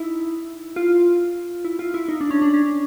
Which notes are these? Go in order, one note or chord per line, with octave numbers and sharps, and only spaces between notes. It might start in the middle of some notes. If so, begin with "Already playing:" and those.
Already playing: D#4 E4
F4
E4
F4
E4
D#4
D4
C#4
D4
C#4